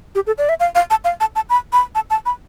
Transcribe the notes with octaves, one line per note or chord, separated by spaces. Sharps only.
G4
A4
D5
E5
F5
F5
A5
F5
A5
A5
B5
B5
A5
A5
B5